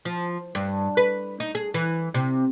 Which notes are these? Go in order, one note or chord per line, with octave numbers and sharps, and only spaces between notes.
F3
G2
B4
D#4
G#4
E3
C3